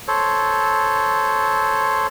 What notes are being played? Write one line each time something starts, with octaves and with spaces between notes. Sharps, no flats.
A4 C5 C#5